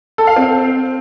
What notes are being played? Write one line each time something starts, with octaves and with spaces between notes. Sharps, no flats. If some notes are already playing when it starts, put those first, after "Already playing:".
A4
F5
C4